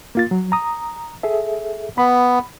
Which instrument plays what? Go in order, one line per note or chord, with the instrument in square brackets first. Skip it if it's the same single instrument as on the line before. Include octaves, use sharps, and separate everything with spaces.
[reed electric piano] A#3 F4 A6
F#3
A#5 D#6
G#4 A4 E5
[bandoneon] B3 [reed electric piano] B5